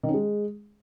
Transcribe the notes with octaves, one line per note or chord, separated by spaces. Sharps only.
D#3
C#4
G#3